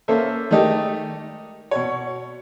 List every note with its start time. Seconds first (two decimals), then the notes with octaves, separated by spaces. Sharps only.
0.08 A#3 C#4 A4 C5 E5
0.51 D#3 G#3 A3 D#4 G4
1.71 B2 C#5